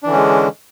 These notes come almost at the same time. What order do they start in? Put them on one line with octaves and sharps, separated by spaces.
D4 E3 D3 C#4 G#3